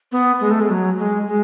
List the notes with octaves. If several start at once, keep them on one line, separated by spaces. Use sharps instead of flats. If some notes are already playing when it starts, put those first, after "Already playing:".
B3
G#3
A3
G#3
F#3
G#3
G#3